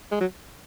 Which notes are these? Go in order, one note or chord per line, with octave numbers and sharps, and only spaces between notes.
G#3
F#3